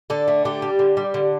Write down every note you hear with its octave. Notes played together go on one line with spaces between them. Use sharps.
D3 A4
A3
D3 G4
G3
D3
G3
D3